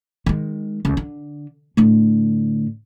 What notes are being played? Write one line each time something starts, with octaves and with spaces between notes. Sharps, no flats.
D#3 G#3
C#2
D3
A2 D3